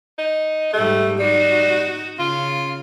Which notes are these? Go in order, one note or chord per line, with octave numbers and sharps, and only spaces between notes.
D#4
G#2 G3 A3 G4
G3 D#4 F#4
C#3 F4